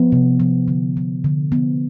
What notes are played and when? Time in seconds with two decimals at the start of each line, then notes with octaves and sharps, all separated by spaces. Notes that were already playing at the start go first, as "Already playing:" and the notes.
Already playing: F3 B3
0.12 C3
0.40 F3
0.68 D3
0.97 F3
1.24 D3
1.52 F3 B3